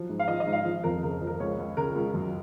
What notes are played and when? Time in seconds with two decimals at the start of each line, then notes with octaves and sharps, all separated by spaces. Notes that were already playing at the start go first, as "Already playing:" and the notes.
Already playing: F3 F#3
0.09 G#2
0.19 F5
0.28 F3 D#5
0.40 D#5
0.47 G#2
0.53 F5
0.65 F3
0.84 F2 A#4
1.03 C#3 A#4
1.21 F3
1.27 A#4
1.40 C#2 C#5
1.58 C#2
1.77 C#3 A#4
1.95 C#2
2.14 F#2